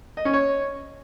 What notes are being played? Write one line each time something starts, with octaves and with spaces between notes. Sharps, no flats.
D#5
C#4
C#5